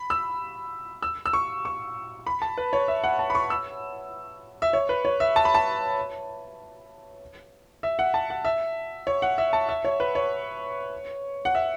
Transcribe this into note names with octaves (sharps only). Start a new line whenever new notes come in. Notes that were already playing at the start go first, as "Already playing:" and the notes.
Already playing: B5
E6
E6
E6
C#6
C#6
B5
A5
B4
C#5
E5
F#5
A5
B5
C#6
E6
E5
C#5
B4
C#5
E5
A5
B5
A5
E5
F#5
A5
F#5
E5
C#5
F#5
E5
A5
E5
C#5
B4
C#5
F#5
E5